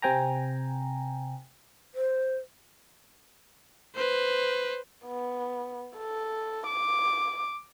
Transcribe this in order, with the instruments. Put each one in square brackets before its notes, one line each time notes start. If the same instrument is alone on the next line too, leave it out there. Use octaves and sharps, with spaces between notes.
[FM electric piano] C3 C4 G5 G#5 A#5
[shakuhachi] C5
[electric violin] B4 C5
[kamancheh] B3
A4
D6